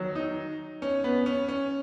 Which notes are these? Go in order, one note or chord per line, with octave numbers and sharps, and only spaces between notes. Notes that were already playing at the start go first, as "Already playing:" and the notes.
Already playing: D#3 F#3
D#4
C#4
B3
C#4
C#4